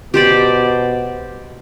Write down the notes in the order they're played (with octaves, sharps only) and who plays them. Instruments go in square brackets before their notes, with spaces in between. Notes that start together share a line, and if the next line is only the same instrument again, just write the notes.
[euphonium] B2 [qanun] G4 C5 D5